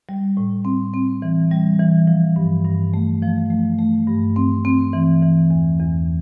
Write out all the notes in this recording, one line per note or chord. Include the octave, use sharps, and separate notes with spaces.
G3
A2
C4
C4
E3
G3
E3
F3
G2
G2
A3
F3
A3
A3
G2
C4
C4
E3
E3
E2
E2